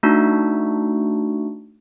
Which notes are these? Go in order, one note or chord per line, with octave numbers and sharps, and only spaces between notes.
A3 D4 D#4 F#4